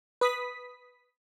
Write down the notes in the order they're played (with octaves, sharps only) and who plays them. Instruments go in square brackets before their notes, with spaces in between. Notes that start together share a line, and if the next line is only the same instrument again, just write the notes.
[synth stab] B4 D#6 B6